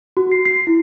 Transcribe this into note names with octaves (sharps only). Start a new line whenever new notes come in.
F#4
C7
C7
E4